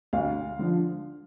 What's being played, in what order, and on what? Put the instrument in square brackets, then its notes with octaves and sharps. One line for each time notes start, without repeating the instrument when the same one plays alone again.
[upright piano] D2 F5
D3 F3